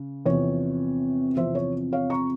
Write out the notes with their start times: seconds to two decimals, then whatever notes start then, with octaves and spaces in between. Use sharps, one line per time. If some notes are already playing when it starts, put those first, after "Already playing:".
Already playing: C#3
0.26 E2 C3 F3 C#5
1.37 E2 C3 F3 C5 E5
1.55 C#5
1.92 C#5 F5
2.10 A#5 C#6